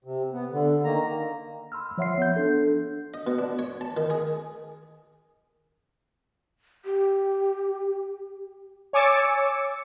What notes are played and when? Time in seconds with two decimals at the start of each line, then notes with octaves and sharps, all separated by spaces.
0.04 C3
0.33 B3
0.51 D3
0.84 D#3 A#3 A#5
1.72 B5 C6 E6 F6
1.98 F3 C#5 E5 F#5 C6 C7
2.18 B3 G6
2.36 D4 A4
3.14 D#5
3.27 B2
3.39 D4
3.59 C#5
3.81 A5
3.97 D#3
4.10 G#4
6.85 G4
8.93 C#5 G#5 D6 E6 A6 C#7